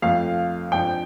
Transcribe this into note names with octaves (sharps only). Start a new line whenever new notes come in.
F2 F3 A3 F5
F2 F3 D4 G5